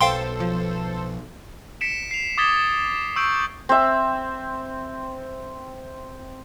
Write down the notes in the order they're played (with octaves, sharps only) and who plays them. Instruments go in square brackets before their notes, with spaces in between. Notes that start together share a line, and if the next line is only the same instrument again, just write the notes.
[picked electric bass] B1 [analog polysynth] A4 C5 [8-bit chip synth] F5 G5 C6
[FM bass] F3
[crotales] B6 C#7 D7 E7
C7 F7
D6 D#6 G#6 A6 B6 G7
C#6 E6 G6 D7 F#7
[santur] C4 E5